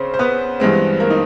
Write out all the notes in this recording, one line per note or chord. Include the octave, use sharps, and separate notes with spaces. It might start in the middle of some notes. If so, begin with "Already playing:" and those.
Already playing: C#3 C4 C#4 C5
C5
B3 B4
G2 E3 G#3 C4
A#3 A#4
D#4